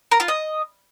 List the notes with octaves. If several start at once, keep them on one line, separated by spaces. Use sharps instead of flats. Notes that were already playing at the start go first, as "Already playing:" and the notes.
A#4
F4
D#5